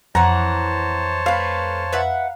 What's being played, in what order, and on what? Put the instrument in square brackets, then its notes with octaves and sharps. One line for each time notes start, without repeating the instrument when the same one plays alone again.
[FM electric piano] F2 [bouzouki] E3 F#5 [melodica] C5 C#5 A5 [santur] A#5
[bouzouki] A3 B4 [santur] F5
[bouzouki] B4 E5 F#5